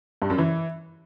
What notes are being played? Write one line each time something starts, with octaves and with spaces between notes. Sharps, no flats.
G2
F#2
E3